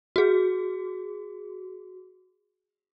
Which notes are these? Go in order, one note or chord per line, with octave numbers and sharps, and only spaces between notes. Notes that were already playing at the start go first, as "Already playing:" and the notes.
F#4 G#4